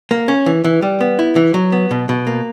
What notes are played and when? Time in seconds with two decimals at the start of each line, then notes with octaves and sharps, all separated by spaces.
0.11 A#3
0.28 C#4
0.46 E3
0.64 E3
0.82 G3
1.01 B3
1.19 E4
1.36 E3
1.54 F#3
1.72 B3
1.91 B2
2.09 B2
2.27 A#3